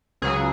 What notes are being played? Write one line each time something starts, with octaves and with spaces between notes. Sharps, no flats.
C#2 C#3 F#3 G#4